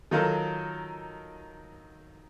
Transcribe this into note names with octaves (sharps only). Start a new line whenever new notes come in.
D#3 F#3 D#4 F4 A4 A#4